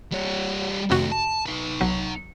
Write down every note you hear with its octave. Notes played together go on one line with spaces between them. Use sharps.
G3 C#5
F2 C3 D#3 A3 F#4
A5
D#4 B4
B1 F#3